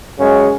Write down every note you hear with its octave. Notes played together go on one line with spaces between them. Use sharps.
F#2 C#3 G#3 C#4